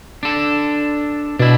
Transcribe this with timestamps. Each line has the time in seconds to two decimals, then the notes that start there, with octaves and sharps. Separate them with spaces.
0.23 D4 A4
1.39 B2 D4 E4